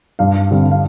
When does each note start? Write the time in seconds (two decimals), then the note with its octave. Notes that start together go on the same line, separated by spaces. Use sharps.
0.19 G2 F5
0.50 D3 G3 C4
0.71 F5